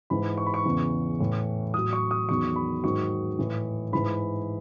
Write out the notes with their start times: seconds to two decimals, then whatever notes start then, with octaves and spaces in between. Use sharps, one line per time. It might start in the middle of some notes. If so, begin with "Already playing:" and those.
0.10 G#2 E3 B5
0.37 C#6
0.46 B5
0.54 C#6
0.65 E2 C#3 E3
1.20 A2 E3
1.74 A2 F#3 D#6
1.93 C#6
2.11 D#6
2.29 E2 D#3 F#3 C#6
2.56 B5
2.83 G#2 D#3 F#3 C#6
3.39 A2 E3
3.92 G#2 E3 B5